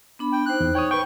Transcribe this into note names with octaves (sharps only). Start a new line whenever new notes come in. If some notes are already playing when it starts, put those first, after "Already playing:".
B3 D4 B5
G5
D#4 C5 F#6
E2
C#5 G5 D#6
B4 G5 C#6